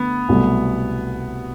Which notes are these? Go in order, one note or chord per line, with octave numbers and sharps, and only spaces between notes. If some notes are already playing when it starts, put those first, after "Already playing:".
Already playing: D3 A3 B3
C2 B2 F#3 A3